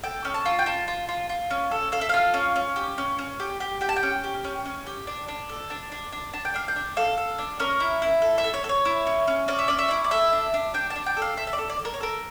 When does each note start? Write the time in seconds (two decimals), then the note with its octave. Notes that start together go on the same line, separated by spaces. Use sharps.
0.03 A4 G5
0.25 C#4
0.34 A5
0.46 F4
0.59 G5
0.66 F4 A5
0.88 F4
1.09 F4
1.29 F4
1.51 C#4
1.71 A4
1.92 A4 F5
2.01 E5
2.09 F4 F5
2.34 C#4
2.56 C#4
2.76 G4
2.98 C#4
3.19 C#4
3.40 G4
3.60 G4
3.81 G4 G5
3.89 A5
3.96 G5
4.03 C#4
4.24 G4
4.44 C#4
4.65 C#4
4.86 G4
5.07 D4
5.28 D4
5.49 A4
5.70 D4 A5
5.92 D4
6.12 D4
6.33 D4 A5
6.45 G5
6.54 D4 F5
6.68 G5
6.76 D4
6.97 A4 F5
7.18 A4
7.38 D4
7.60 C#4 A#4
7.80 E4
8.02 E4
8.22 A4
8.38 E5
8.44 A4
8.54 C#5
8.64 A4
8.69 C#5
8.85 E4
9.07 C#4
9.27 C#4
9.48 C#4 D5
9.59 E5
9.68 C#4 D5
9.79 E5
9.89 E4 D5
10.04 D5
10.11 A4 E5
10.33 D4
10.54 D4
10.74 D4 G5
10.90 A5
10.96 D4
11.06 G5
11.17 A4
11.22 F5
11.37 A4 E5
11.47 E5
11.53 D5
11.58 A4
11.70 D5
11.79 A4
11.85 A#4
11.94 C#5
12.00 A4 A#4